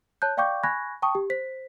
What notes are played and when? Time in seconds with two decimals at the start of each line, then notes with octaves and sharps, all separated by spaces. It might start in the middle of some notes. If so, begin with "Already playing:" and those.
0.22 C#5 A5 F#6 G6
0.37 D5 F5 G5 C#6 D6 G6
0.63 G#5 B5 C#6 F#6 G#6 A#6
1.02 G5 A5 C#6 D#6
1.15 G4
1.30 C5 B6